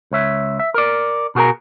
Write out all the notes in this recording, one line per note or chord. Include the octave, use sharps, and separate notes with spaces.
C#2 C#5 E5
E5
A#4 D5
B2 F#4 G#4 A#4 A#5